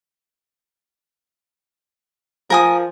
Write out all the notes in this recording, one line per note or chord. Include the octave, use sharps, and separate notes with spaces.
F3 A#4 G#5 D#6